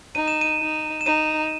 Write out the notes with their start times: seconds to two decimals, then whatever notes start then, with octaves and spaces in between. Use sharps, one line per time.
0.15 D#4 D#7
0.28 E7
0.41 D#7
0.60 D#4
1.01 E7
1.06 D#4 D#7